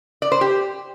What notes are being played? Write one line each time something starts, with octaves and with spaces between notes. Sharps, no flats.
D5
C5
G4